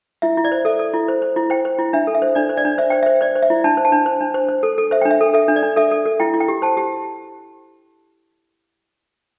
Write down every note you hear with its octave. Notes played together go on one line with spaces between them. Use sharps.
E4 E5
E4
D5
C5
A4 E5
A4
E4
C5
C5
E4
C5 G5
C5
E4
D4 E5
A4
E5
C5
D4 D5
C5
D5
D4
C5 E5
C5 G5
C5 E5
C5 D5
C5
E5
E4
D4 A5
C5
A5
D4
C5
D4
C5
C5
A4
A4
C5 E5
D4 G5
E5
A4
A4 E5
D4
D5
D4
A4 E5
A4
A4
E4 G5
E4
G5
G4
C5 A5
G4